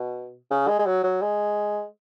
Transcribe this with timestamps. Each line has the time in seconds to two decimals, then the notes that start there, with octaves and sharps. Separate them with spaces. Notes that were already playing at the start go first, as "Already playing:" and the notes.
Already playing: B2
0.51 C#3
0.68 G#3
0.79 G#3
0.86 F#3
1.03 F#3
1.22 G#3